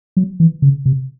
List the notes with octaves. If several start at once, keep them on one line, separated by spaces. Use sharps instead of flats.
F#3
E3
C#3
C3